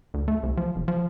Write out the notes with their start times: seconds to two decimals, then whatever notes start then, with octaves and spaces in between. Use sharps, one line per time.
0.14 D2
0.28 A3
0.43 C2
0.57 F3
0.76 E1
0.88 F3